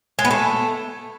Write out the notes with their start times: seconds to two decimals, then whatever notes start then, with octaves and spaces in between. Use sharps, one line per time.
0.19 G#3
0.25 B3
0.31 A3